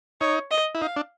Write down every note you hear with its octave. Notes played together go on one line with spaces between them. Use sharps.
D#4 C#5
D#5
E4
D#4 F5
D4